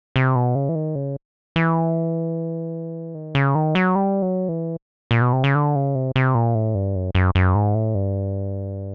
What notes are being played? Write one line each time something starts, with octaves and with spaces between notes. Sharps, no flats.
C3
B2
C#3
E3
D#3
C#3
E3
D#3
C#3
D#3
F#3
G3
F#3
E3
A#2
B2
C3
C#3
D3
C#3
C3
C3
A#2
A2
G2
F#2
F#2
F#2
G#2
A2
G2